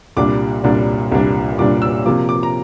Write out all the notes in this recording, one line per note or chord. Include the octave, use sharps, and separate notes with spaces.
C2 A#2 G3 D4 D6
C2 A#2 G3 D4
C2 A#2 G3 D4
C2 A#2 G3 D4 D6
E6
C3 F3 A#3 D6
D6
A#5